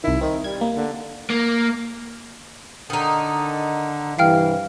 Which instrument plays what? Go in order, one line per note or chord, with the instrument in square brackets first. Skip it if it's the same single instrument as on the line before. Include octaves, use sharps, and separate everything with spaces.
[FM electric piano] C2 D#3 [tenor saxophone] E4
[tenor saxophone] D#3 [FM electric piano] C4
[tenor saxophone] G3 [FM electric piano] G#6
[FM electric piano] A#3
[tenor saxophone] D3
[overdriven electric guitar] A#3
[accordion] D3 [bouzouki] D#3 D#4
[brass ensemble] G2 C3 E3 [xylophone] F5 G5 F6